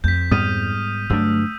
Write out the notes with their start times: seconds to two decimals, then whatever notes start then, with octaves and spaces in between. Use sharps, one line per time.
0.04 F2 G6 B6
0.31 G#2 G3 B3 D#6 F6 D#7
1.10 G2 D3 F#3 A3 D4 E6